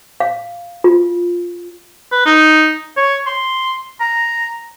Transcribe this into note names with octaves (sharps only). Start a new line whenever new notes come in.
F5
F4
B4
D#4
C#5
C6
A#5